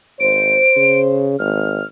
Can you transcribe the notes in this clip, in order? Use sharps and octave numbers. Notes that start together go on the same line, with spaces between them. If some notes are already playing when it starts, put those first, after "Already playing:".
G#1 C5 D7
C#3
G#1 F6